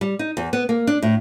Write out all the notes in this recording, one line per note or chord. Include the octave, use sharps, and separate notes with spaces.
G3
D#4
E2
B3
A#3
D4
A2